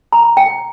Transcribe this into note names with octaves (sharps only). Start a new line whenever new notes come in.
A#5
G5